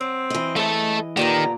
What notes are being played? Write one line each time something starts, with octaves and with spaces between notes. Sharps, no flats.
F#3 C4
E3 D#5
G#3 A3 C#4 A4
A#2 D3 D#3 B3 G4 A#5